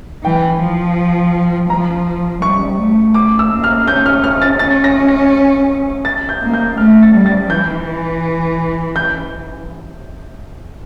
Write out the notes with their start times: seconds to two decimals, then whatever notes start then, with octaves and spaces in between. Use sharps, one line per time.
0.24 E3 G5
0.60 F3
1.69 F3 A#5
2.42 G3 C#6
2.78 A3
3.14 A3 D6
3.39 E6
3.51 A#3
3.64 F6
3.87 C#4 G6
4.06 F6
4.24 F6
4.42 A6
4.59 C#4 A6
4.84 A#6
5.08 A#6
6.05 A6
6.29 G6
6.41 A#3
6.54 G6
6.77 A3 F6
7.02 A6
7.14 G3
7.26 A6
7.50 E3 G6
8.96 G6